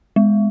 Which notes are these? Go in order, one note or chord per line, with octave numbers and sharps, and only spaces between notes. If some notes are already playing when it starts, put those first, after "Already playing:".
G#3